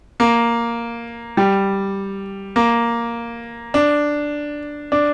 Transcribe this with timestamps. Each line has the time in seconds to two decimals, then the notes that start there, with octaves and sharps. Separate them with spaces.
0.20 A#3
1.37 G3
2.56 A#3
3.74 D4
4.92 D4